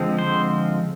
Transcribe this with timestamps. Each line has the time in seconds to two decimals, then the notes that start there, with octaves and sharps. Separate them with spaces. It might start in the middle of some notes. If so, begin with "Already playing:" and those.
Already playing: D3 F3 G#3 C4
0.19 C5